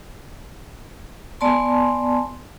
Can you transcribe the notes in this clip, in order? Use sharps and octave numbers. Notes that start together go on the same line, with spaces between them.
B3 D5 G#5 A5 C6